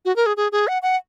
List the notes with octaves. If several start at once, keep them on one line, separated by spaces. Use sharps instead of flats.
F#4
A#4
G#4
G#4
G#4
F#5
F#5